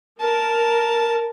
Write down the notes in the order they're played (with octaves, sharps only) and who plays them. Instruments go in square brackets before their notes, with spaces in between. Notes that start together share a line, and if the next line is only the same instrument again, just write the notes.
[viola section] A#4 [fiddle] A5